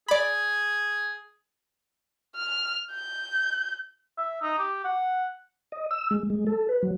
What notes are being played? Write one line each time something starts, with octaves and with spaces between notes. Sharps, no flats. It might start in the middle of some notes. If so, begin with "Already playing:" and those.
G#4 D5 B5
F6
G6
E5
D#4
G4
F#5
D#5
E6
G#3
G#3
A4
B4
F#3